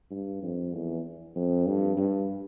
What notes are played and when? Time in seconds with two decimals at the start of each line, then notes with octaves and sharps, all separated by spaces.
0.11 G2
0.42 F2
0.73 E2
1.35 F2
1.66 G2
1.97 G2